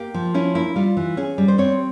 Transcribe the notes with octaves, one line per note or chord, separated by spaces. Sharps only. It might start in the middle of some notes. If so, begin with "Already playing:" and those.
Already playing: A#3 G4
F3
C#4 E4
A#3 E4
G3 F4
E3
C#4 G#4
G3
C5
C4 C#5